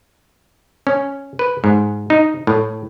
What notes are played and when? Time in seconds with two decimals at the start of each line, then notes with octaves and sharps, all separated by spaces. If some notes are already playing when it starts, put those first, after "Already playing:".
0.87 C#4
1.39 B4
1.64 G#2
2.10 D#4
2.47 A2